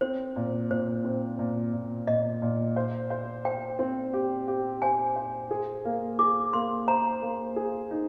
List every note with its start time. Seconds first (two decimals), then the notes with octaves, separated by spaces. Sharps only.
0.01 C4 C5
0.36 A#2
0.70 A#2 C5
1.04 C4
1.39 A#2
1.73 A#2
2.07 A#2 D#5
2.42 A#2
2.76 C5
3.10 C5
3.45 C5 G5
3.79 C4
4.13 G4
4.48 G4
4.82 C5 G#5
5.16 C5
5.51 G#4
5.85 A#3
6.19 G#4 D6
6.53 A#3 C6
6.88 C5 A#5
7.22 A#3
7.56 G#4
7.91 D#4